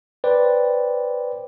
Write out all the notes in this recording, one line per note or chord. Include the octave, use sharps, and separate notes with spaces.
B4 C5 D5 G5